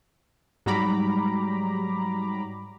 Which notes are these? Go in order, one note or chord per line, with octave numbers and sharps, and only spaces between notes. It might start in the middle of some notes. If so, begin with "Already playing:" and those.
G#2 F#3 G3 A#5 B5 D6